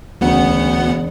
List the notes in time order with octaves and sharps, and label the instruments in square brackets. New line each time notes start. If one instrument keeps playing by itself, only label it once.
[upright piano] E1 C#3 [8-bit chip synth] D2 B3 F#5